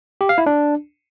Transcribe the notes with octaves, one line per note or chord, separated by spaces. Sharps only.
G4
F5
E4
D4